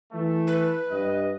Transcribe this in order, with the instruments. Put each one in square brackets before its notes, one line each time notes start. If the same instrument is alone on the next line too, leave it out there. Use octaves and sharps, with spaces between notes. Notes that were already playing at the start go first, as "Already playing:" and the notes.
[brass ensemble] E3 A3
[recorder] B4
[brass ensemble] G2 D#5